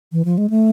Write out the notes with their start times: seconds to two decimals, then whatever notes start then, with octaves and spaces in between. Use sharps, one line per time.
0.12 E3
0.25 F3
0.38 G#3
0.50 A3